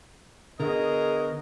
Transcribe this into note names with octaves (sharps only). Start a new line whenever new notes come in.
D3 B3 F#4 G#4 A#4 D#5